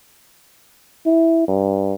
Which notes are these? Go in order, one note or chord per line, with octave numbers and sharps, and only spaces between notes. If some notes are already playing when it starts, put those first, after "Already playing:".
E4
G2